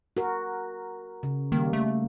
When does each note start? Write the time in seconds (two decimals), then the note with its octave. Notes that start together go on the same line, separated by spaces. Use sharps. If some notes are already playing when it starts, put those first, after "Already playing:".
0.17 F#4 A#4
1.23 C#3
1.52 D#3 G3 A#3
1.73 A3